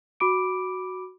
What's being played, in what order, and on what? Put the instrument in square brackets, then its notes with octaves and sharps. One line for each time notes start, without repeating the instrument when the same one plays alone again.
[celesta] F#4 B5 D6 D7